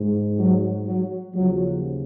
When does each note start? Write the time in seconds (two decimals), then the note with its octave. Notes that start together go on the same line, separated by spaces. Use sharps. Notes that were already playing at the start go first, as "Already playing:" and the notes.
Already playing: G#2
0.38 F#3
0.86 F#3
1.34 D#2 C#3 F3 F#3